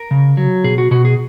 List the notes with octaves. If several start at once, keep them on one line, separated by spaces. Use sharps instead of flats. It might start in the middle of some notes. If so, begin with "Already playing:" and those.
Already playing: A#4
C#3
F#3
B2 G#4
F#4
B2 F#4
G#4